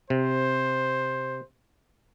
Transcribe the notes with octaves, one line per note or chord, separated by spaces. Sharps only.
C3 C5